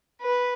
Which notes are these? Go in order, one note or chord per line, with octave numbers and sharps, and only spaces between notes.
B4